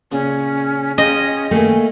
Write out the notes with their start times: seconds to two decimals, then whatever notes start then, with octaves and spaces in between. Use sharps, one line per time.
0.12 A#2 C#3 C#4
0.98 C#4 F4 G#4 D#5 G5
1.51 D#3 A3 A#3 G#5